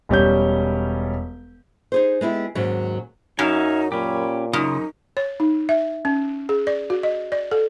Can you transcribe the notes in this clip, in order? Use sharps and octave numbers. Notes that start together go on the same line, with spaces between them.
E1 G3 C#4 G6
D#4 G#4 C5
G#3 B3 E4 G4
D#2 G#2 F#3 C#4
F#2 F#3 D#4 E5 F5 G#5
A#2 C#4 G4 B5
F#2 C#3 D#4 F4 D#6
C#5
D#4
E5
C#4
G#4
D5
F#4
D#5
D5
A4